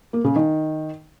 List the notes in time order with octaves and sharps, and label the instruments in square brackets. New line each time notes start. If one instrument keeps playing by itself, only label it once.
[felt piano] A#3
C#3
D#3